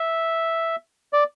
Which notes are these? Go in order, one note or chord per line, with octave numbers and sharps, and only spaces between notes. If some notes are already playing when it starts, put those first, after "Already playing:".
Already playing: E5
D5